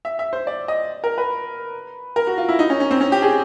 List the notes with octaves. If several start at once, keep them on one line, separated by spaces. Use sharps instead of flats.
E5
E5
C5
D5
D#5
A#4
B4
A#4
F#4
F4
E4
D#4
C#4
C#4
C4
C#4
G4
G#4